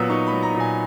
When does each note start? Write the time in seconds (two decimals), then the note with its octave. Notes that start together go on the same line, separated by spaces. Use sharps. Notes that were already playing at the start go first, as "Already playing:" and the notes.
Already playing: A#2 F#3 B3 D#6 E6
0.10 D#4 C#6
0.27 B5
0.32 F#3
0.43 A#5
0.54 A#2
0.60 G#5